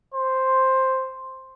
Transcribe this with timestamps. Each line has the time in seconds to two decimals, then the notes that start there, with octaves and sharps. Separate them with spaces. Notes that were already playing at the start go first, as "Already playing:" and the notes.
0.14 C5